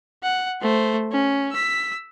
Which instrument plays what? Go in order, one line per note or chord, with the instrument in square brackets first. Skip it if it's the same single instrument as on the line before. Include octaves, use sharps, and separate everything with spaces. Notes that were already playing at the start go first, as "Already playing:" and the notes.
[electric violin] F#5
A3 C5
C#4
E6 B6